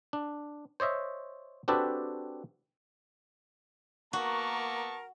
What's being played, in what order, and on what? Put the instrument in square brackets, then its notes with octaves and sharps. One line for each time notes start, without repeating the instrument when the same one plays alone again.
[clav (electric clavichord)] D4
C5 C#5 D#5 E5
C4 D4 F#4 G4 A4 B4
[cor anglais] A#3 [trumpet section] B3 A5 C#6 [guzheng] F#4 [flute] A#4